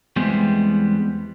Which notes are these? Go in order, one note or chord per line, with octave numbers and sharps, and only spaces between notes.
E2 G3 G#3 B3 C4